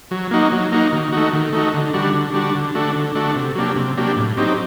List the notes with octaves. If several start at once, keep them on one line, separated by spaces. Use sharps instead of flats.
F#3
A#3 D#4 F#4
F#3
A#3 D#4 F#4
D#3
A3 D#4 F#4
D#3
A3 D#4 F#4
D3
G3 D4 F#4
D3
G3 D4 F#4
D3
A3 D4 F#4
D3
A3 D4 F#4
C3
F#3 A#3 D4 G4
C3
F#3 A#3 D4 G4
A2
F#3 C4 D#4 G4